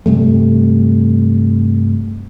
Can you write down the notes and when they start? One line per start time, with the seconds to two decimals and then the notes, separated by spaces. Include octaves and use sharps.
0.06 G2 C3 G3 A3